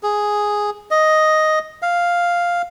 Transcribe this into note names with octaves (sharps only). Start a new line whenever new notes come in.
G#4
D#5
F5